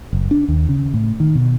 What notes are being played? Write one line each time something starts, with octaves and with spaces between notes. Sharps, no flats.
F#1
D4
D#2
C#3
A2
D#3
B2